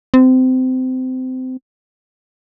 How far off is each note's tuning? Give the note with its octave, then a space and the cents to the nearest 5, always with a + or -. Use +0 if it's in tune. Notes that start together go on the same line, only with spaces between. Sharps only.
C4 -25